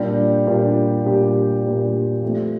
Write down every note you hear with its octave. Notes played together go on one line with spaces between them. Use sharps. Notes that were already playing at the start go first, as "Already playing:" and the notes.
Already playing: A#2 G3 D4 G4
A#2 G3 D4 G4
A#2 G3 D4 G4
A#2 G3 D4 G4
F3 A3 C4 G4